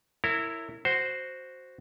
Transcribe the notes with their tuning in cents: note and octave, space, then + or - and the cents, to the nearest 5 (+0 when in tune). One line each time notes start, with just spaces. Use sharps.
E4 +0 A#4 -30 C#5 +0
F#4 +0 C5 +0